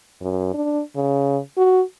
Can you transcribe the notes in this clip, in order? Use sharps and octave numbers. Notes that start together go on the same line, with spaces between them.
F#2
D4
C#3
F#4